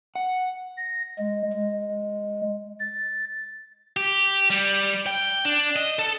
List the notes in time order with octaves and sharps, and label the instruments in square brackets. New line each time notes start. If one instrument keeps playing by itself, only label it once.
[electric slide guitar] F#5
[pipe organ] A#6
G#3
G#3
A6
[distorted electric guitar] G4
G3
G5
D4
D#5
A4